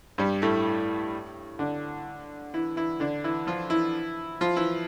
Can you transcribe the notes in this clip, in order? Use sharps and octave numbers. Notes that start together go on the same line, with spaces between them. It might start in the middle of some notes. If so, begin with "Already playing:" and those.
G2 G3
A2 A3
D3 D4
E3 E4
E3 E4
D3 D4
E3 E4
F3 F4
E3 E4
F3 F4
E3 E4